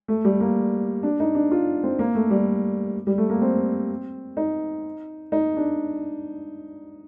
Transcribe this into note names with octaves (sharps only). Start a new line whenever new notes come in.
A3
G3
A#3
D4
D#4
D4
F4
C4
A#3
A3
G3
G3
A3
A#3
C4
D#4
D#4
D4